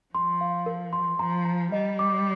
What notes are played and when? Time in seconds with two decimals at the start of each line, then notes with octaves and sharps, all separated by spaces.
0.14 F3 C6
0.41 F5
0.66 A#4
0.93 C6
1.19 F3 A#5
1.45 A#5
1.72 G3 D#5
1.99 D6